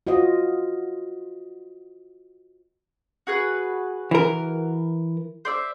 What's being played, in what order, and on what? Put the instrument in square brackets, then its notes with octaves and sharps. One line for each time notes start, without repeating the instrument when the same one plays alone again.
[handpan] F4 F#4 C5 D#5
[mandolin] F#4 G#4 B4
[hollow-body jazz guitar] E3 A#4
[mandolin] C5 D5 E5